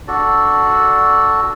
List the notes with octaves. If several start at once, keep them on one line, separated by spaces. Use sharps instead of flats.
D4 F#4 A4 D5